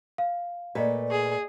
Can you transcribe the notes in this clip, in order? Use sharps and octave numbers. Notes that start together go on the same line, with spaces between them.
F5
A#2 A3 B4 D5 D#5
G#4